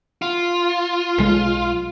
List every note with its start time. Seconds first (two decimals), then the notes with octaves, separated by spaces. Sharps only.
0.22 F4
1.18 B1 G#3